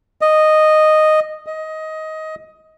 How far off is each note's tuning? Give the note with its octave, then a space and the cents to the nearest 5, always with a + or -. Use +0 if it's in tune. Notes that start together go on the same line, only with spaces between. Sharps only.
D#5 -5
D#5 +15